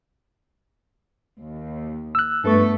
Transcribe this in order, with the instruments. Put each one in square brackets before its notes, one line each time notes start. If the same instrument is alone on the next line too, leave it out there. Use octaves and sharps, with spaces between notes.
[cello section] D#2
[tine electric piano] E6 F#6
[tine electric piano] G2 B4 C#6 [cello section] A3 B3 A4